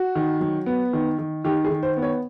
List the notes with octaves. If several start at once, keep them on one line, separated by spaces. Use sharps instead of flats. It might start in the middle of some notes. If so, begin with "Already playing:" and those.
Already playing: F#4
D#3
F#3
B3
D#3
D#3
D#3 G4
G#4
D#3
C5
B3
C#5